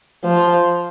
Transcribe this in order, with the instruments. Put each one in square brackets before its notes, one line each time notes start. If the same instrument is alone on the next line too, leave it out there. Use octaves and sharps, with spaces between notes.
[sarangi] F3